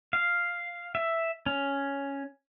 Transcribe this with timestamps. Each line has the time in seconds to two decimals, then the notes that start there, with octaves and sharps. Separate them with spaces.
0.13 F5
0.95 E5
1.46 C#4